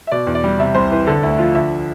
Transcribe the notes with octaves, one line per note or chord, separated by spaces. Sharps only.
E5
B2 D5
E2
D5
G3
C3 E5
C2 C5
E3 B4
D3 A4
D2 E4
F3 F4
D3 E5